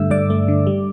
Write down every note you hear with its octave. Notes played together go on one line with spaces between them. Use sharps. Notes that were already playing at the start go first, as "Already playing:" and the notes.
Already playing: G2 D3 A3 E5 E6
G2 D5 D6
A3
D3
G3